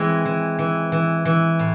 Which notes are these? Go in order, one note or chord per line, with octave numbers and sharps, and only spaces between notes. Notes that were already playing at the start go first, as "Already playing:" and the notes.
Already playing: E3 G#3 C4
E3
E3
E3
E3
A2